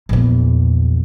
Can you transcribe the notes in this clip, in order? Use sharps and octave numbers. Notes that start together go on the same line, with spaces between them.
A#1 E2